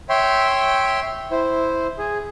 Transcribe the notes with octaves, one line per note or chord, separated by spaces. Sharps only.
C#5 E5 G5 C6
E4 C5
G#4